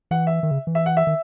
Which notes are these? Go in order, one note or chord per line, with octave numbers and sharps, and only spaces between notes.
E3 F#5
E5
D#3
C#3
E3
E5
F#5
E5
D#3